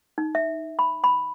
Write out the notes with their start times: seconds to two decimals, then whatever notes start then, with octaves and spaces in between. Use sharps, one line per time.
0.18 D#4
0.35 E5
0.79 B5
1.04 B5